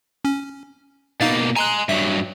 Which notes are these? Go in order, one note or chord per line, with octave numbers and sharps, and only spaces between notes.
C#4
B2 A#3 D#4 F5 A6
G#5 A#5 C6 F#6
G2 F#3 E5